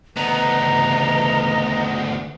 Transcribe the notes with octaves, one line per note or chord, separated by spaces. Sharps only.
D2 C#3 E3 B3 D#5 A#5